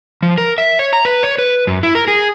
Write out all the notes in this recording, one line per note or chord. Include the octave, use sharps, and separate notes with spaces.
F3
A#4
E5
C#5
A#5
B4
C#5
B4
F#2
E4
A#4
G#4